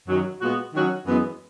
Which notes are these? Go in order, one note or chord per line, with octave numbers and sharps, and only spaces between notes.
F#2 D#3 F#3
A#2 G#3 B3 F#4
D#3 F#3 C#4 F#4
F#2 E3 G#3 B3